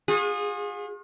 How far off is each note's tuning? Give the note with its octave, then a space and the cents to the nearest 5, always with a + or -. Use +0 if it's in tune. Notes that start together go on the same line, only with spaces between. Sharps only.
F4 +45 G#4 -20